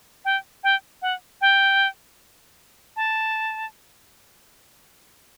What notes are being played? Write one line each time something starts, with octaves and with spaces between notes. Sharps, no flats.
G5
G5
F#5
G5
A5